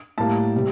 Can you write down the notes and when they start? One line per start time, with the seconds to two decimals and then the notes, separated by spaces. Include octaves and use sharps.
0.18 A2 G3 A#3 A5
0.55 C3 G3